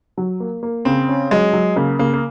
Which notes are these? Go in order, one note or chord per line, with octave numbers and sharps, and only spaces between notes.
F#3
A#3
A#3
C#3 C4
C#4
F#3 G#3
F#3
C#3 A#3
C#3 A#3
A#3